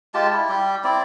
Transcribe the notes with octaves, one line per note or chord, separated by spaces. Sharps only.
G#3 F4 G4 A5
E4
G3 G4
C4 E4 D5